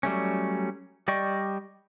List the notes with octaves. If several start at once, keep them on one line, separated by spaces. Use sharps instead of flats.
F#3 G3 A3 C#4
G3 D5 D#5 G5 C#6